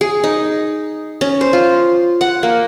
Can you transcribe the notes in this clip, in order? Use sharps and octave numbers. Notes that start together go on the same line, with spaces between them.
G#4
D#4
C#4
C5
F4
F#5
A#3